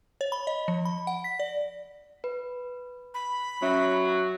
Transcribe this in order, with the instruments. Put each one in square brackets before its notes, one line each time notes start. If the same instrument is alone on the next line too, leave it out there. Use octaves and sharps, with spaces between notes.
[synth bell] C#5
B5
D#5
F3
B5
F#5
B6
D5
[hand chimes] B4
[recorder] B5
[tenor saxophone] F#3 [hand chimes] C#4 E5